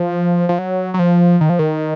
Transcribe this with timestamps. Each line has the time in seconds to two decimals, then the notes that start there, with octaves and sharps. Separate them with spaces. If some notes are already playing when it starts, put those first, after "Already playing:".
Already playing: F3
0.49 F3
0.59 F#3
0.94 F#3
0.99 F3
1.41 D#3
1.50 F3
1.59 D#3